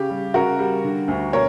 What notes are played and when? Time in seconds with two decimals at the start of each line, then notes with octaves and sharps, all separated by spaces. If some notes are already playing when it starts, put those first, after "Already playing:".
Already playing: C#3 G4
0.10 G3
0.34 C#3 F#4 A#4
0.59 G3
0.84 D3
1.08 D2
1.33 B2 A#4 C#5